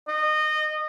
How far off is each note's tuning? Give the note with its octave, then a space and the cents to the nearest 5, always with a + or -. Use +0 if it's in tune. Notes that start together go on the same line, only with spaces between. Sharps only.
D#5 -25